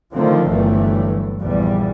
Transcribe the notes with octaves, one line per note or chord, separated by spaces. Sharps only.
D3 D#3 F3 A3 C4
G1 G2 E3 F#3 A3
A#1 E2 G3